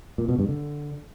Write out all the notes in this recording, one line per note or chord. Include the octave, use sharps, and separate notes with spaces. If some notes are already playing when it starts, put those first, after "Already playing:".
A#2
B2
G2
D3